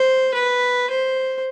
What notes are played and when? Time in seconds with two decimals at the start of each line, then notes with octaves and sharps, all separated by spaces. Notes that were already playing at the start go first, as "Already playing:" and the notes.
Already playing: C5
0.34 B4
0.90 C5